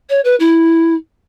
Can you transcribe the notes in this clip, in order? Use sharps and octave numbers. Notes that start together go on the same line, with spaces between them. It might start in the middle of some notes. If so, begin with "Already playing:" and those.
C#5
B4
E4